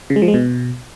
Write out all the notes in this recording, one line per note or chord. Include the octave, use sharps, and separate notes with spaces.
C#3
G#3
F3
G#3
B2